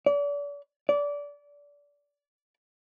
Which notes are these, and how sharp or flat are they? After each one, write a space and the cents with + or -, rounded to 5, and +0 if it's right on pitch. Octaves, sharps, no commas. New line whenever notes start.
D5 -40
D5 -25